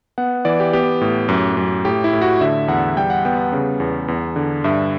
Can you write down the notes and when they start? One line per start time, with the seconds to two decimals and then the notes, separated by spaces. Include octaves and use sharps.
0.18 B3 F#5
0.45 E3 D5
0.60 G4
0.73 B3 G4
1.01 A2
1.29 F#2
1.57 F#2
1.85 A2 G4
2.04 E4
2.13 A2
2.22 F#4
2.41 D3 E5
2.68 E2 F#5
2.97 G3 G5
3.10 F#5
3.25 B3 G5
3.38 F#5
3.53 C#3
3.80 E2
4.08 E2
4.36 D3
4.64 G2 E5